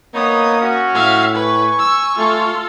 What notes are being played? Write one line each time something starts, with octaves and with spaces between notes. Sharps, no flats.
A#3 B3 D#4 C#5 D#6
C#4 F#4
A2 E5 F5
B4 G#5 C#6
E6
A3 F4 A4